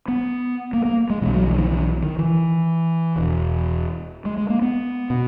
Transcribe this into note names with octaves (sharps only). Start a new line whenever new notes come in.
B3
A#3
A#3
G#3
B1 B2 E3
F#3
E3
D#3
E3
D#3
E3
E1 E2 B2
G#3
G#3
A#3
B3
B2